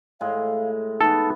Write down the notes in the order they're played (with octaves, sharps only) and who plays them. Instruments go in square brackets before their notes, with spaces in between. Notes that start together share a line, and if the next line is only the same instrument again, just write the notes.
[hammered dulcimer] A2 G#3 [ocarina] F5
[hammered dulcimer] E3 B3 [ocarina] D#4 [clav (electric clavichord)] A4